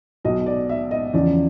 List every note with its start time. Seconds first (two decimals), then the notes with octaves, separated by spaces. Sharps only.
0.25 B1 B2 D#5
0.46 D5
0.69 E5
0.91 D#5
1.13 E2 C#3 F3 D5